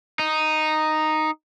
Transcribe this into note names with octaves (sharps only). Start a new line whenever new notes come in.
D#4